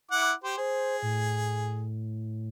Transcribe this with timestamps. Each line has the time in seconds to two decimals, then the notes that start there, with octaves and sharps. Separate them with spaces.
0.11 E4 F#5 D6
0.44 G4 C5
0.57 G#4 C5
1.02 A2